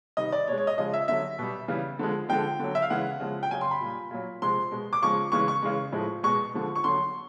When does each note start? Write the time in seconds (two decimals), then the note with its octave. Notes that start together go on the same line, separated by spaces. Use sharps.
0.17 C3 D#3 G3 D#5
0.32 D5
0.48 B2 G#3 C#5
0.58 C#5
0.67 D#5
0.78 C#3 F3 G#3 D#5
0.94 E5
1.08 D3 F#3 E5
1.39 B2 G3
1.68 C#3 E3 G3
1.99 D3 F3 G#3
2.29 D3 F3 G#3 G5
2.59 D3 F#3
2.75 E5
2.82 F5
2.90 C#3 E3 G#3 F#5
3.20 C#3 F3 G#3
3.43 G5
3.51 C#3 F#3 G#5
3.61 C6
3.71 B5
3.80 A#2 G3
4.11 A#2 F#3
4.42 C3 F3 G#3 C6
4.71 B2 G#3
4.93 D6
5.02 C#3 F3 G#3 C#6
5.32 C#3 E3 G#3 C#6
5.48 C#6
5.62 C#3 E3 G#3
5.92 A2 F3 G#3
6.23 B2 G#3 C#6
6.54 D3 F3 G#3
6.76 C#6
6.84 D3 F#3 C6